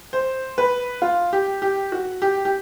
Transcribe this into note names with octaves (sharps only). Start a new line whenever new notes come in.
C5
B4
F4
G4
G4
F#4
G4
G4